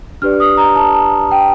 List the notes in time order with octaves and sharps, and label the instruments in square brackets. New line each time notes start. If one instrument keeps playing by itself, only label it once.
[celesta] D4 G4 B4 D5 F6
D#6
A#5
A5
A5
G5